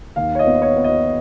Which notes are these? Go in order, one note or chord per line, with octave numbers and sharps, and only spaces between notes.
D#2 F5
C#5
D#5
B3
C#5
B3
D#5